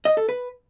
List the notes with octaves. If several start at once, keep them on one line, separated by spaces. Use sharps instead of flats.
D#5
A4
B4